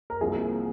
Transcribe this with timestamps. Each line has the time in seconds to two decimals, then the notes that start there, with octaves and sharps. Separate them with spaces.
0.10 A#4
0.20 C2 C3 F3 A#3 G#4